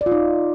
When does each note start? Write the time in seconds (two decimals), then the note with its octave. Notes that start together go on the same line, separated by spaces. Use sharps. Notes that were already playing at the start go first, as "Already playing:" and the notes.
0.01 D5
0.06 F4
0.12 D#4